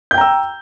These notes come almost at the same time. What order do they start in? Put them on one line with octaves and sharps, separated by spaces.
G6 G5 A#5 E6